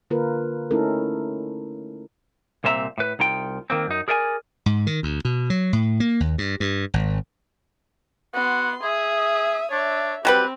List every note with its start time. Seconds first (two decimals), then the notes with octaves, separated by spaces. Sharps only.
0.10 D3 A#3 F4 A#4 B4
0.71 A3 C#4 D#4 E4 A4 A#4
2.64 C2 A#2 C4 E5 A#5
2.98 A2 B4
3.19 C2 D#4 F4 G5
3.70 D#3 A#3 C4
3.87 F#2 D#4
4.08 G#4 A#4 D5 E5 G#5
4.66 G#2
4.87 D#3
5.03 D2
5.25 B2
5.50 F#3
5.73 A2
6.00 A#3
6.20 D#2
6.38 G2
6.60 G2
6.94 G#1
8.34 B3 F#4 C6
8.83 G#4 E5 D#6
9.71 D4 C#5 E5
10.25 F#3 G3 C4 G4 B4